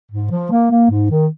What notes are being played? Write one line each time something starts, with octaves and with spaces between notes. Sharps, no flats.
G#2
F3
A#3
A#3
G#2
D#3